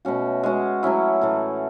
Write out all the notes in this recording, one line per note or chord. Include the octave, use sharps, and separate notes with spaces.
B2 A3 C#4 F#4
G#3 C#4 F#4
F#3 A3 C#4 E4
A2 E3 A3